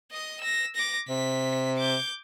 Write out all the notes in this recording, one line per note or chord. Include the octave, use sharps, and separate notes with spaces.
D#5 D#6
E6 A#6
D6 A#6
C3 B6
D6 G6